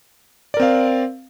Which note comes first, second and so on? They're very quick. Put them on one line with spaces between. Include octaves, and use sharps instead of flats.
D5 A#4 C4 F5